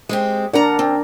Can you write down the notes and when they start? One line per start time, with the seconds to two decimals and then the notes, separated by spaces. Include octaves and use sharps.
0.09 G#3 C4 G4
0.53 D4 A#4 D5 F#5 A#5
0.79 C4